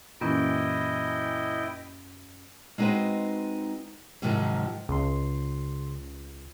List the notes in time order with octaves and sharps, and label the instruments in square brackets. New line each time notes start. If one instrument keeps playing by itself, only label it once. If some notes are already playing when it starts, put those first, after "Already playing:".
[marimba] F#2 C#4 [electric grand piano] A#2 E3 [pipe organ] E4 D#5 G5
[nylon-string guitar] G#3 C4 D#4 F#4 B4 C5
G#2 C3 D#3 F3 F#3
[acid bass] C#2 [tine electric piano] C#3 C6